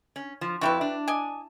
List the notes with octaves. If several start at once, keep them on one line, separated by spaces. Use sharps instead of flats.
C#4
F3
F2 E4 F#4 G4 B4
D4
D5 D#5 G#5